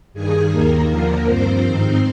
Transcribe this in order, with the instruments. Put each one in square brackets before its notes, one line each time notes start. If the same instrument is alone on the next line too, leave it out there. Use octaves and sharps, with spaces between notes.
[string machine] G2 D#3 G#4 G#5
D#2 D#3 A#3 A#4
D#2 D3 F3 A#3 A#4
G2 F3 C4 C5
G#2 D#3